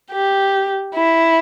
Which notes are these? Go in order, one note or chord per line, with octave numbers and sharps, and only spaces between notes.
G4
E4